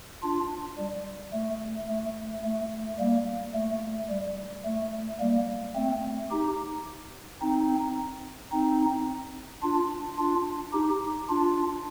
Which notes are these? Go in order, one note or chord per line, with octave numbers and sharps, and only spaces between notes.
D4 F4
G3
A3
A3
A3
G3 A#3
A3
G3
A3
G3 A#3
A3 C4
D#4 G4
C4 D#4
C4 D#4
D4 F4
D4 F4
D#4 G4
D4 F4